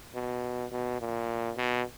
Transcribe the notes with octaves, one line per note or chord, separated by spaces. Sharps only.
B2
B2
A#2
B2